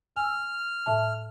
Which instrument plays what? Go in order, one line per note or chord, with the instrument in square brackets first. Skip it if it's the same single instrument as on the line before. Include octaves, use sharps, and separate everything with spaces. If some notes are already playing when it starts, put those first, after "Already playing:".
[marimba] G#5 E6 [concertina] F6
[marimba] A2 E5 A5